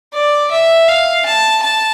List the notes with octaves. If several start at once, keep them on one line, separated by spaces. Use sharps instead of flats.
D5
E5
F5
A5
A5